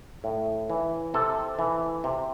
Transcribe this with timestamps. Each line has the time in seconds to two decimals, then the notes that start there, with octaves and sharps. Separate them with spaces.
0.24 A2
0.70 E3
1.14 C3 A4
1.59 E3
2.04 C3